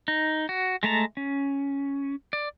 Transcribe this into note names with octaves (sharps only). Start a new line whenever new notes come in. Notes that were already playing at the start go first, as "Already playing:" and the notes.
D#4
F#4
G#3 A3 A5 A#5
C#4
D5